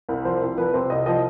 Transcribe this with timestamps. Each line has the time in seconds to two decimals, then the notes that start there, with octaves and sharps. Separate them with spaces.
0.09 C2
0.25 F3 C5
0.42 C2
0.58 F3 B4
0.74 C3 C5
0.90 C2 D#5
1.06 F3 D#5